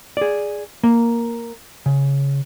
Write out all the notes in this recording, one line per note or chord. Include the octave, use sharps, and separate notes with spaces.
G#4 D5
A#3
C#3